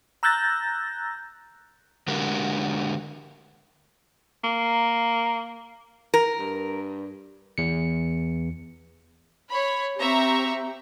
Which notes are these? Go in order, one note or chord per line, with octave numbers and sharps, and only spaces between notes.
A#5 E6 F#6 G6 A6 A#6
D3 G#3 D4 F#4 G4 A#4
A#3
A#4
G2
E2 C#7
C#5 B5
C4 G4 E5 A#5 C#6